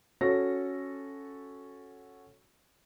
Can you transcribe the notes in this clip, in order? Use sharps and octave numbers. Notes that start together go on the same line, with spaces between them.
C#4 F#4 A4 A#6